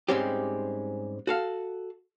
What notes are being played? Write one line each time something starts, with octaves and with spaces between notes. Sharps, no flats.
G#2 G3 G#3 C4 C#4 G4
F#4 A4 F5